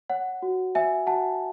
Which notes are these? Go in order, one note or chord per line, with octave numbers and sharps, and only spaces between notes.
C#5 F#5
F#4
C#5 E5 G#5
F#4 F#5 A5